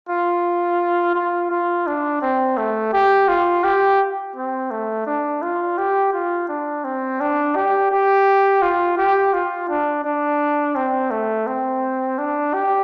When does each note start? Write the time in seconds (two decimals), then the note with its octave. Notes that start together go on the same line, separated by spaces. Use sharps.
0.09 F4
1.15 F4
1.51 F4
1.87 D4
2.22 C4
2.57 A3
2.93 G4
3.28 F4
3.64 G4
4.36 C4
4.71 A3
5.06 D4
5.42 F4
5.78 G4
6.13 F4
6.48 D4
6.84 C4
7.20 D4
7.55 G4
7.92 G4
8.62 F4
8.97 G4
9.33 F4
9.69 D4
10.04 D4
10.75 C4
11.11 A3
11.47 C4
12.18 D4
12.53 G4